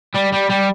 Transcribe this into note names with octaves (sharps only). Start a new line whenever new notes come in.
G3
G3
G3